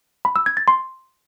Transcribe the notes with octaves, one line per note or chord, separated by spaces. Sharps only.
B5
E6
G#6
A6
C6